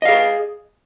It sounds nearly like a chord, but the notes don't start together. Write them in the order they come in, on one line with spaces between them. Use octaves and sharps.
D#5 F5 G#4